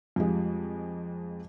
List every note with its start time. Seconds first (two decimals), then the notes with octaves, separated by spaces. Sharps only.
0.16 F2 F3 G3 G#3